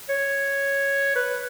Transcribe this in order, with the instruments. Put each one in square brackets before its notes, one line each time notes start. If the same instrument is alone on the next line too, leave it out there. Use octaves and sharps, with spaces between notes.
[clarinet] C#5
B4